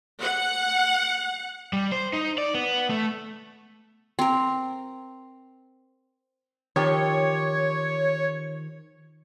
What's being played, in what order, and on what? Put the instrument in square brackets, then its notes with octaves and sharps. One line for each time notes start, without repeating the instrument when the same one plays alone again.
[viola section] F#5
[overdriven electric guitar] G3
C5
D#4
D5
B3
A3
[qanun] C4 A#4
[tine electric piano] D#3 [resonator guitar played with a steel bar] F3 G4 [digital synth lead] C#5